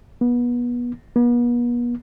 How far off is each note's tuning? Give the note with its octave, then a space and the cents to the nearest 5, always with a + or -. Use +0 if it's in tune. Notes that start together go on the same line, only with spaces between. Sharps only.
B3 -30
B3 -45